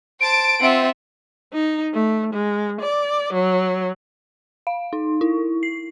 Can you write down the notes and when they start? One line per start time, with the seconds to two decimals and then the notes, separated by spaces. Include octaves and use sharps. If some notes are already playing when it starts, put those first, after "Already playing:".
0.21 C5 A5 D7
0.61 C4 F4 E5 F#5
1.53 D#4
1.94 A3
2.34 G#3
2.81 D5
3.33 F#3
4.67 F5
4.93 D#4
5.21 E4
5.63 C7